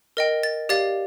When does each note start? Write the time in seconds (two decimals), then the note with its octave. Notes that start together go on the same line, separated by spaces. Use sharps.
0.17 A#4 D#5 G5
0.43 A6
0.69 G4 D5 F5 A6